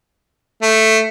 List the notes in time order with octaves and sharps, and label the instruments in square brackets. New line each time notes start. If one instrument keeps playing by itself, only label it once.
[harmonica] A3